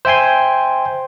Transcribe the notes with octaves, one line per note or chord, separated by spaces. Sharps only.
C5 E5 G5 G#5 C6